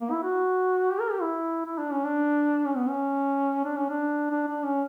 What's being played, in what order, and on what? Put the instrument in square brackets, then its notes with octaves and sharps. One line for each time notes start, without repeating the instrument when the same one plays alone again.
[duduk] A#3
E4
F#4
G4
A#4
G4
E4
E4
D4
C#4
D4
C#4
B3
C#4
D4
C#4
D4
D4
D4
C#4